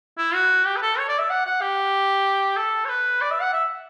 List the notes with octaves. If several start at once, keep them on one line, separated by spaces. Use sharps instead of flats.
E4
F#4
G4
B4
A4
C#5
D5
E5
F#5
F#5
G4
A4
C#5
B4
D5
E5
F#5
E5